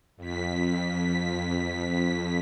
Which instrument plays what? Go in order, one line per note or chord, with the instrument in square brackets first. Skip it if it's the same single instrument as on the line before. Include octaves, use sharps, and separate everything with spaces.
[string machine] F2 B6